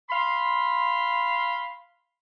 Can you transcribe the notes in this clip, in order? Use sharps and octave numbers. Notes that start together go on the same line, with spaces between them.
F5 B5 C6